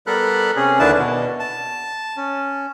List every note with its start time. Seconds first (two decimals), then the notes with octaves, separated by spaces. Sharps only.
0.07 G3 B3 A4 A#4 B5 F#6
0.56 C3 C#4 G#4
0.79 D#2 D3 D4 E4 B4 A5
0.98 B2
1.40 A5
2.17 C#4